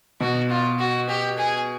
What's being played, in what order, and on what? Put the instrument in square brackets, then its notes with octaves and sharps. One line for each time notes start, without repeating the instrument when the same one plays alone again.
[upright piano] B2 [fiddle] F#4
[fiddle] F4
F#4
G4
G#4